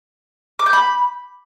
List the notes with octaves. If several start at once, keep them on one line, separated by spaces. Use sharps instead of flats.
D6
G6
B5